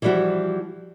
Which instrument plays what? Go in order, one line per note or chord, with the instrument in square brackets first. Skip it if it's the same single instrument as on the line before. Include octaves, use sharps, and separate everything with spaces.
[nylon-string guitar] E3 F3 G3 E4 F#4